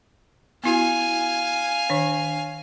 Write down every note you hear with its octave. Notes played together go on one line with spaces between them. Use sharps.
B3 E4 F#4 F5 G#5
D#3 D4 C#5